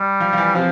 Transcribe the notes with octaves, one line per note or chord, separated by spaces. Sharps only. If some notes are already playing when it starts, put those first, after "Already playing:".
Already playing: G3
F3
F3
E3
C3 F3